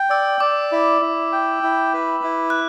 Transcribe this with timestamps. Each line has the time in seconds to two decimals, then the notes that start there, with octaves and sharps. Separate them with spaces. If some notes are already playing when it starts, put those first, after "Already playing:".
Already playing: G5
0.10 D5 E6
0.40 D5 D6
0.72 E4
1.01 E4
1.32 G5
1.63 E4
1.94 B4
2.24 E4
2.50 F#6